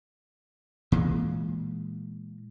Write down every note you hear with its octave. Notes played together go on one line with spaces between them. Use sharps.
A#2 E3 G#3